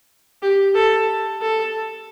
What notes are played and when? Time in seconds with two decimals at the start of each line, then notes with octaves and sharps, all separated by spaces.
0.42 G4
0.75 A4
1.41 A4